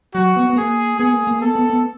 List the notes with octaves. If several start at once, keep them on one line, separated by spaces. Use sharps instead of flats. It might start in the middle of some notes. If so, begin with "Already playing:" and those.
F#3 F#4
B3
B3
A#3 G#4
B3 G#4
A#3
A#3
B3 A4
B3
B3